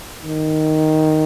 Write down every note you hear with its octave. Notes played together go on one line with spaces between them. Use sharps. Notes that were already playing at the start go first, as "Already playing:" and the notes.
D#3